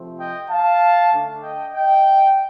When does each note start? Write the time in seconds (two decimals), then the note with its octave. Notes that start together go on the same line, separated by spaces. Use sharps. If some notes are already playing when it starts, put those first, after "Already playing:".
Already playing: C3 F3 A3 C4
0.19 D#5 G5
0.50 F5 A5
1.12 D3 A3 D4
1.42 D#5 G5
1.74 D#5 G5